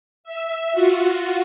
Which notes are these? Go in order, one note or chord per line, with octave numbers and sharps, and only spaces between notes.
E5
F4 F#4